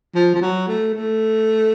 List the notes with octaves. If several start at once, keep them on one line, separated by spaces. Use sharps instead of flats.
F3
F3
F#3
A3
A3